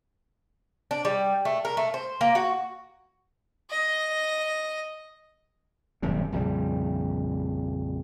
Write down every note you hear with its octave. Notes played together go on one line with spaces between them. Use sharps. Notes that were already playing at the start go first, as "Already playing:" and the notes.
D4
G3
A3
A#4
A3
C5
A#3
F#4
D#5
D#1 F#2 A2 C3
A#1 F2 C#3 G3